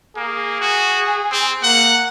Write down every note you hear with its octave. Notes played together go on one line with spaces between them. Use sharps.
A#3 G#4
F#4
C4
A#3 F#5